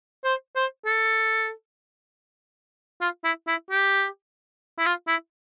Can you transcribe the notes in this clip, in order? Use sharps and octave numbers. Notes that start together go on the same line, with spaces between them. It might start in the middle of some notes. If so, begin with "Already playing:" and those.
C5
C5
A4
F4
E4
E4
G4
E4
F4
E4